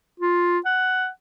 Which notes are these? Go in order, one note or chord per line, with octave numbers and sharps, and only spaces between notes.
F4
F#5